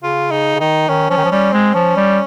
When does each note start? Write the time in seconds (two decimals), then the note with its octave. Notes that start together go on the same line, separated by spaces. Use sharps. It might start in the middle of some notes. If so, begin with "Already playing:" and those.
0.03 C#3 F4
0.31 C#3 D#4
0.55 C#3
0.60 D#3 D#4
0.88 D#3 C#4
1.10 F3 C#4
1.17 D#3
1.24 F3
1.31 G3 C#4
1.53 G#3 C4
1.74 F3 C#4
1.96 G3